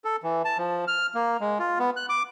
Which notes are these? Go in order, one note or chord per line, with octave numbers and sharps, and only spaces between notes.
A4
E3
A5
F3
F6
A#3
G#3
F4
B3
F#6
D6